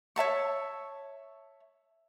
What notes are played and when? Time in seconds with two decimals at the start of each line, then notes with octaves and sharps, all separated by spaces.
0.16 C#5 E5 A5 C#6